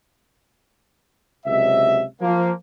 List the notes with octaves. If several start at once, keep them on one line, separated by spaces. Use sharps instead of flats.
C#2 C3 F#3 D#5 E5
F3 A#3